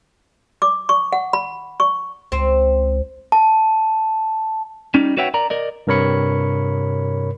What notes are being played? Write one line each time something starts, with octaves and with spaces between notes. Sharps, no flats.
D6
C#6
F#5
B5
C#6
C#2 C4
A5
G3 C#4 D#4
F#4 B4 C#5 E5 F#5 G5
A#4 D5 A#5
A#4 D5 D#5
G2 C3 A#4 C#5 B5 C#7